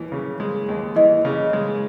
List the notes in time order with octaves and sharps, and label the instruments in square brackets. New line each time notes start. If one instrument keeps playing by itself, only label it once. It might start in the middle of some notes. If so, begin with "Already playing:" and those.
Already playing: [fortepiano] D#2 E3
C#3
G#3
D#2
[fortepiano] E3 [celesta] D#5
[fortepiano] C#3
G#3